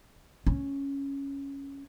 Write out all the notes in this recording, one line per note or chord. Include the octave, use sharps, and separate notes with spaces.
C#4